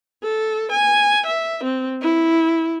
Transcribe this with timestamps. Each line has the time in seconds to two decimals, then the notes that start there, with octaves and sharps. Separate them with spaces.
0.23 A4
0.72 G#5
1.26 E5
1.64 C4
2.01 E4